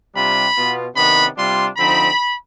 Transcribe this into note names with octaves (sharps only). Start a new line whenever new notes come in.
C3 G3 D4 F4 B5
B2 B3 F4
C3 D#3 B3 D4 B5
C3 G3 D4 F4 C6
D3 F3 C4 D#4 B5